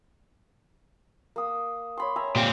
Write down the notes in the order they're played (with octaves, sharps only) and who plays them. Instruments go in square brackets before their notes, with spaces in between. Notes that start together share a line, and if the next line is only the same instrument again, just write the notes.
[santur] A#3 D#6
C#5 B5 C6
E5 G#5 A#5
[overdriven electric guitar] A#2 C4 [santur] G3 G4